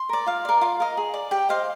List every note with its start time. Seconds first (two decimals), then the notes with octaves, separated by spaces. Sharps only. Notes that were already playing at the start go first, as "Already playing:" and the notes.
Already playing: C6
0.09 A#4 D5
0.26 F4 F5
0.45 A#4 D5
0.61 F4 F5
0.80 A#4 D#5
0.97 G#4
1.14 D5
1.31 G4 G5
1.49 C5 D#5 F5